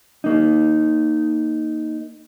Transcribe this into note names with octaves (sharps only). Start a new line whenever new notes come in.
A#3 D#4